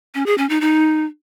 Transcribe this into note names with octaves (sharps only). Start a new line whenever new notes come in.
C#4
G#4
C#4
D#4
D#4